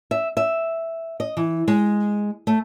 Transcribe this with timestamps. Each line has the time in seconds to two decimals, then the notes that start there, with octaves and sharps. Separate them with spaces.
0.11 E5
0.37 E5
1.20 D#5
1.37 E3
1.68 G#3
2.47 A3